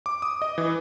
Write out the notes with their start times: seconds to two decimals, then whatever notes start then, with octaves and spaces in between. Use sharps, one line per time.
0.06 D6
0.22 D#6
0.42 D#5
0.58 E3